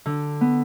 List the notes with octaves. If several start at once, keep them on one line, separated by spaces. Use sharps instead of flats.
D3
B3